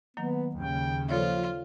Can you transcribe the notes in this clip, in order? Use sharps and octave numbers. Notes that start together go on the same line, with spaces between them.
D#3 F#3 A#3 B3
D#2 C#3 G5
F3 F4 A4 C#5 D5